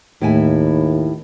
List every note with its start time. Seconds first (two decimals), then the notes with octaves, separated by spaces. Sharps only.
0.21 D#2 A2 E4 G#5